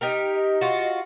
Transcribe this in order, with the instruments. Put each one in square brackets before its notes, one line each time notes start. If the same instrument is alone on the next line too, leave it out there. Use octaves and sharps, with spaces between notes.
[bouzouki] D#4 G4 A#4
[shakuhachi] D#5
[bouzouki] F4 F#4